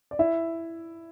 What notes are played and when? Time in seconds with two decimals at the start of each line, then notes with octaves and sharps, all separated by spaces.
0.11 D5
0.19 E4 E5